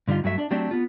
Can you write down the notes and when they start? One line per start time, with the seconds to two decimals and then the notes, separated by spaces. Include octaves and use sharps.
0.08 G2 D3 G3 D#4 F4
0.24 G2 F#3 A3 E5
0.38 D4 D5
0.51 F#3 A3 C4 D4 G4
0.71 B3 F4